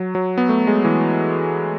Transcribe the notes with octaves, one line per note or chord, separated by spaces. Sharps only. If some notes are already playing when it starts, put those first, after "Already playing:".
Already playing: F#3
F#3
B3
A3
G#3
E3